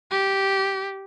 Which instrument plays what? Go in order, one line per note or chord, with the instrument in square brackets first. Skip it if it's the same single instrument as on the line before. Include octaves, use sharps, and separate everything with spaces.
[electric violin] G4